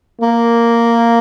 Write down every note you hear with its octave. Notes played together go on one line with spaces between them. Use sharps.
A#3